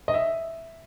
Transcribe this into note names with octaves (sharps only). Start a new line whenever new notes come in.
D#5
E5